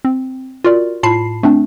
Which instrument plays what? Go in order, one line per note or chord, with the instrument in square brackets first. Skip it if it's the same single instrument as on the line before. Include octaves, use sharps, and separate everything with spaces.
[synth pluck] C4
F4 F#4 A#4 D5
A2 F4 A5 B5 C7
A3 C4 D4